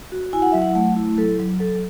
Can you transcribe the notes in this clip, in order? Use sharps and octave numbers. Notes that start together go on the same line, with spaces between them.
F#4
E4 G#5
F#5
F#3 E5
F#5
A3 F#5
E4
F#3 A4
F#3
F#3 A4